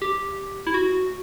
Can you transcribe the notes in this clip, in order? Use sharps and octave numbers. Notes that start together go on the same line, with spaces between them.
G4
E4
F#4